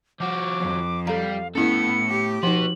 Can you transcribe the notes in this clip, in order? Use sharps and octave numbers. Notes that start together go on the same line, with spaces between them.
F3 F#4 D6
F2
G3 A4 F5 A#5
A2 B3 C#4 E4 A4 C#7
G4
F3 B3 D#4 F#4 F#7